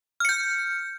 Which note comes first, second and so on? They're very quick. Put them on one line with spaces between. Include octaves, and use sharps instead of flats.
F6 C#7 G6